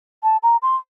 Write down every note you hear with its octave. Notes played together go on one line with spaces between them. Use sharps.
A5
A#5
C6